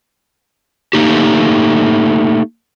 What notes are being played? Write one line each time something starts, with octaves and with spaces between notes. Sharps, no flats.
A3 A#3 D#4 G4